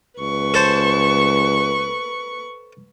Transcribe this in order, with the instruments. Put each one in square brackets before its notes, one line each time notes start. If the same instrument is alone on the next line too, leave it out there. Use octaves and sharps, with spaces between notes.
[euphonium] C#2 [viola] B4 C#6
[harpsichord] A4 C5